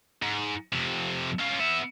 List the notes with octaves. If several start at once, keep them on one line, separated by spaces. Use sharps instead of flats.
G#2
F2 C3
C#4 F4
B3 E5